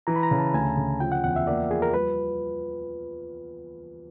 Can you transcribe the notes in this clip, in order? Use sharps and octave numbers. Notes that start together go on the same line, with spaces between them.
E3 A#5
B5
A#5
C#3
A5
D2 G#5
C#3
F3 G5
F#5
E2 F#5
E5
A#3 D5
F3 G#4
A#4
G3 B4